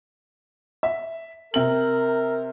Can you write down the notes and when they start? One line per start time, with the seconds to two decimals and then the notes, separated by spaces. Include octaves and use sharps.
0.83 E5
1.54 C3 A#4 F#7